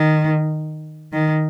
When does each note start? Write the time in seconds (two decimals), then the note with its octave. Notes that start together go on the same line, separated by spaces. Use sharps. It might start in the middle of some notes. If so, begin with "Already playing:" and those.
Already playing: D#3
1.12 D#3